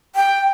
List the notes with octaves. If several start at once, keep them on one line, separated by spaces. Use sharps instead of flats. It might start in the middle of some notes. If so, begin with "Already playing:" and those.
G5